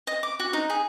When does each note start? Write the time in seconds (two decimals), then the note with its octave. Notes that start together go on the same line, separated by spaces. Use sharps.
0.07 D#5
0.23 D6
0.40 F#4
0.53 D#4
0.70 G#4